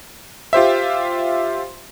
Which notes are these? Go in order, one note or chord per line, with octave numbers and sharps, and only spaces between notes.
F4 G4 C5 E5